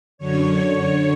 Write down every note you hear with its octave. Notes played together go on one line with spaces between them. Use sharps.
F#2 D3 C#5
F#2 D3
F#2 D3